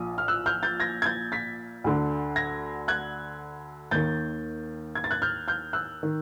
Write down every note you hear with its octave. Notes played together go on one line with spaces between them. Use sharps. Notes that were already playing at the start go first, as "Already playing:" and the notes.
Already playing: A#1 A#2 D#6
F6
E6 F#6
F6 G6
G6 A6
G#6 A#6
G#6
G6 A6
A6 B6
D2 D3
G#6 A#6
F#6 G#6
D#2 D#3 G6 A6
G#6
A6
F#6 G#6
F6 G6
F6 G6
E6 F#6
D#3